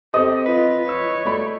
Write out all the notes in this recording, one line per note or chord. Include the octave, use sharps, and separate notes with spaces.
C4 G4 A4 C5 D#5
F4 B4
C#5 E6
A3 F#4 D5 B5